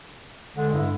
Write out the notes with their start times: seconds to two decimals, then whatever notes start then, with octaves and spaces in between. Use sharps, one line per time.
0.57 D3 G#3
0.73 G2 E4